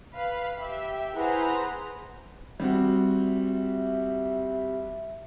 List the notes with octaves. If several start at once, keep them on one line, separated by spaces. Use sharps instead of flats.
B4 F5 B5
G4 E5
E4 G#4 B4 C5 F#5 A#5
G3 C4 F#4 E5